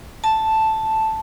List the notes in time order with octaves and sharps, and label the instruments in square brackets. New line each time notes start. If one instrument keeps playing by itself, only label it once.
[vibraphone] A5